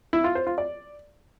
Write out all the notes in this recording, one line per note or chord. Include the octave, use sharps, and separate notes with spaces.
E4
F4
C5
F4
D5